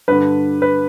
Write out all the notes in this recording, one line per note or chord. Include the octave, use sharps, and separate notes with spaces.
G2 D3 B4
B4